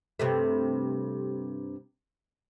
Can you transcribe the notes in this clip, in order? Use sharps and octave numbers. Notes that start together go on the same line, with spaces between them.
G2 C3 A3